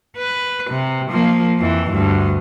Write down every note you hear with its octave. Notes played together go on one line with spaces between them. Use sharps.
B4
C3
F3 A#3
F2 E3
D2 G2